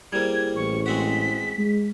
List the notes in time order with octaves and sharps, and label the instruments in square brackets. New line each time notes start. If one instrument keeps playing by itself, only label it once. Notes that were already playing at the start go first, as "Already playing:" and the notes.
[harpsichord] G3 A#3 [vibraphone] E4 G#4 C5 [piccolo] G#6
[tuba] A1 [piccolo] C#6
[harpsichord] G#3 C4 F#4 [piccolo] B6
[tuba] G#3